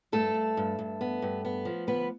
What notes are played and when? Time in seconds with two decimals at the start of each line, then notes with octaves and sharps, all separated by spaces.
0.12 G2 A3 A4
0.34 G2
0.57 G2
0.79 G2
1.01 B3
1.22 G2
1.45 B3
1.65 F3
1.87 D2 B3 B4